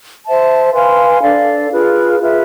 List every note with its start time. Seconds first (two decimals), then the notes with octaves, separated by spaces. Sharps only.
0.25 C5 E5 A5
0.74 B4 F5 G#5 C6
1.22 D4 A4 D5 F5
1.71 F4 G#4 B4
2.21 F4 G#4 B4 E5